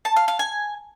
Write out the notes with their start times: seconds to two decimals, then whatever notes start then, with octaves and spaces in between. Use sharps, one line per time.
0.05 A5
0.16 F5
0.28 F5
0.39 G#5